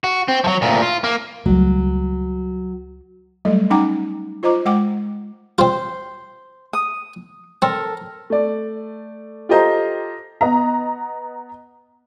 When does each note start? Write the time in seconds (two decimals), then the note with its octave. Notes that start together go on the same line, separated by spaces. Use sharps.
0.04 F#4
0.28 C4
0.44 F3 F#3
0.62 D2 A#2
0.82 F4
1.04 A#3
1.46 C#2 F#3 G3 A3
3.45 F#3 G3 A3 A4 D#5
3.70 C#4 D#4 F#5 G5 A#5 D6
4.43 F4 C5 D#5 A#5 D6
4.66 G#3 F#5 G5 D6
5.58 C4 F4 C5
6.73 D#6
7.62 C4 A4 A#4
8.30 A3 D5
9.49 F4 G4 A4 C5 D#5 A#5
10.41 B3 D#5 A#5